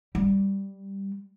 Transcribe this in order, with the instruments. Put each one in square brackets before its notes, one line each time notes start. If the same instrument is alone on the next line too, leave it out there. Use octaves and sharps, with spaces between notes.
[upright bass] G3